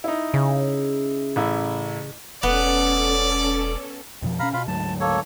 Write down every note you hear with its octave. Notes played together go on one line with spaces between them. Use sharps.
D#4 E4
C#3
A1 E4
E1 B3 C#4 A4 D5
F2 B2 F3
B2 C#4 F5 A#5 B5
B2 F4 F5 B5
D2 G#2 F#3 A5
A#3 A4 C#5